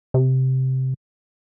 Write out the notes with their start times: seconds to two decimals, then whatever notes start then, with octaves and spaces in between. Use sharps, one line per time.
0.14 C3